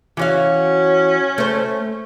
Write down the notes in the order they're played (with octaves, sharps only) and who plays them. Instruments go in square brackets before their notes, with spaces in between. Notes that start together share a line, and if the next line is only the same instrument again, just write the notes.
[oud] E3 F#4 F5 [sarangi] C#4
[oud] A3 C5